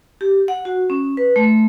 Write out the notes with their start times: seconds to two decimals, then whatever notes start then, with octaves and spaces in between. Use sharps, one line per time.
0.21 G4
0.48 F#5
0.65 F#4
0.90 C#4
1.17 B4
1.36 A3